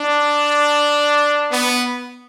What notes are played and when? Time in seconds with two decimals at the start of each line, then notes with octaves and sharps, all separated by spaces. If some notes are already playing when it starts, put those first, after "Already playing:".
Already playing: D4
1.51 B3